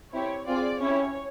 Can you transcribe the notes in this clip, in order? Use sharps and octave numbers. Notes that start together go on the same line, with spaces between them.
C4 E4 G4 C#5
C4 F4 G#4 D5
C#4 E4 G4 C#5